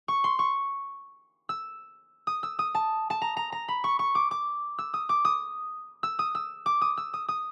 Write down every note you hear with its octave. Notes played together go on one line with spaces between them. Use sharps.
C#6
C6
C#6
E6
D#6
E6
D#6
A5
A5
A#5
A#5
A#5
B5
C#6
C#6
D6
D6
E6
D#6
D6
D#6
E6
D#6
E6
D6
D#6
E6
D#6
D#6